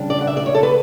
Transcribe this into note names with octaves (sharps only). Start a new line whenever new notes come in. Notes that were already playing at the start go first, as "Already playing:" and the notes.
Already playing: C#3 G3 D4
D5
F#5
E5
D5
C#5
A4
B4